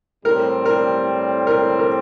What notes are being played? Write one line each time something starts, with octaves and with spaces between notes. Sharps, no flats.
A2 G3 C4 A#4
A#4
A#4
A#4